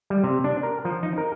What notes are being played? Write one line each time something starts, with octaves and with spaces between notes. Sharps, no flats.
G3
C3
D4
A#4
F3
D#4
A#4